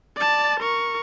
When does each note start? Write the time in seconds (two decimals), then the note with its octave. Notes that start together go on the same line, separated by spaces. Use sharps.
0.17 D5 A5
0.60 A#4 C#6